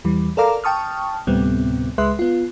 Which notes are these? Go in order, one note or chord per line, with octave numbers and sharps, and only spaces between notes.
E2 E3 G3
A4 A#4 D5 F5 A#5 D6
G5 A5 C#6 D#6 F6
D2 A2 C3 G3 B3 C4
C#2 G#3 B4 E5 C6 F#6
B3 F4